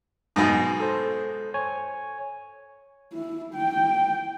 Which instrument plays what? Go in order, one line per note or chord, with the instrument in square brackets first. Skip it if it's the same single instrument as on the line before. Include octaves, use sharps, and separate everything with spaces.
[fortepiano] G#2 B2
[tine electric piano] A4 C5
C#5 G#5
[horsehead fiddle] E4
G5